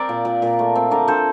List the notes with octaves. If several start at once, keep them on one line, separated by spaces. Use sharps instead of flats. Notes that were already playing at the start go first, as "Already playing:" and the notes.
Already playing: C4 A#4 D5
A#2
A#2
A#2
A3
C4
D3 A#4 D5
D3 A4 C5